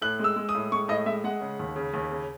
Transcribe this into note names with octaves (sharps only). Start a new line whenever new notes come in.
A2 F#6
G#3 E6
G#3
D#6
A2
G#3 C#6
A2 D#5
G#3 E5
G#3 F#5
C#3
D#2
C#3
D#2
C#3